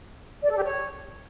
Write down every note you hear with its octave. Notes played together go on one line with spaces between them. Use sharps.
D5
A4
G4
C#5